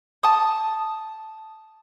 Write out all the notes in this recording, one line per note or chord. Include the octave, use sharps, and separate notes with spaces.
A5 D#6